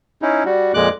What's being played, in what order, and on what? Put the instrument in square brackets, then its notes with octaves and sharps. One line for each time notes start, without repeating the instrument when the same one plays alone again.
[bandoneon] C#4 D#4 E4
G3 F#4
F2 A#2 G#3 D6 F#6